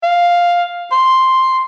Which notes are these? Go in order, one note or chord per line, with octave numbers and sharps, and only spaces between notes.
F5
C6